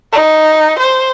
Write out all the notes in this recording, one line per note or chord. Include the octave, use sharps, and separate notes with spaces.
D#4
C5